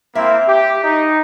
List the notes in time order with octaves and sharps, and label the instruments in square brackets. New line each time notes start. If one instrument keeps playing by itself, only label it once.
[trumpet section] A#3 C4 E4 [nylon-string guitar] E5
[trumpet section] G4
D#4